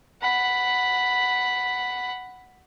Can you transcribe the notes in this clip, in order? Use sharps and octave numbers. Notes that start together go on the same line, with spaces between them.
F#5 B5